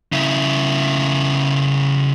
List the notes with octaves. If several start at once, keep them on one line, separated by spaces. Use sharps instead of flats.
C#3 E4